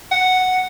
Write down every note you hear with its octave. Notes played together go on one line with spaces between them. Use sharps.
F#5